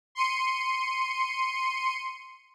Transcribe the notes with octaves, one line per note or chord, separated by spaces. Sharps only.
C6 C#7 D#7